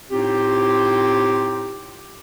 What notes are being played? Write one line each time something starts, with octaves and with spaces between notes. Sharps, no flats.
A2 C4 D#4 F4 G4